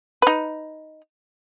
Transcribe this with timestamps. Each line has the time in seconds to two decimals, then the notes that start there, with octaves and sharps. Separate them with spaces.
0.22 D#4 B4